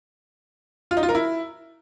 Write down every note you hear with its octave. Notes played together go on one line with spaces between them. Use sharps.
F4
D#4
F4
A#4
E4